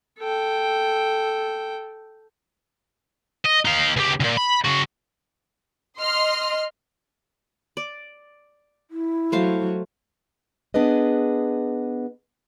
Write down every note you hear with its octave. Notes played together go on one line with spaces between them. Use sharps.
A4 G5
D#5
D#4 F5
C#2 G4
A#2 C#3
B5
C#3 F#4
D#5 C6 F6
D5
E4
F#3 A3 C5 F5
B3 D4 G#4 B4 D#5